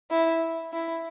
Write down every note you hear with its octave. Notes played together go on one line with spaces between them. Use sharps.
E4
E4